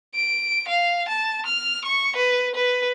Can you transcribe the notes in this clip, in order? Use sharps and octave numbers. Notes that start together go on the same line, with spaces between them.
D7
F5
A5
F6
C#6
B4
B4